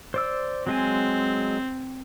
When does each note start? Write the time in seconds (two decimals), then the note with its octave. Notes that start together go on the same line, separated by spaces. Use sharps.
0.14 C5 D5 E6
0.67 F#3 G#3 C4 G#5